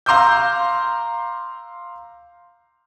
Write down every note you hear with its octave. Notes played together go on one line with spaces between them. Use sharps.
F5 A#5 C6 D6 E6 G6